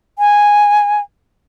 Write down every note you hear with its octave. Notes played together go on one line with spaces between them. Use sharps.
G#5